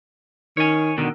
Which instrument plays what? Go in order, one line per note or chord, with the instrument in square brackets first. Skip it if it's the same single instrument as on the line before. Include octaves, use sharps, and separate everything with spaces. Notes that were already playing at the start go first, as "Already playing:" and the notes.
[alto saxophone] D#3 [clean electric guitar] C#5 G#5
[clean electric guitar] B2 D3 D#3